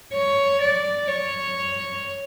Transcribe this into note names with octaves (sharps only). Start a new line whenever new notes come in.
C#5
D5
C#5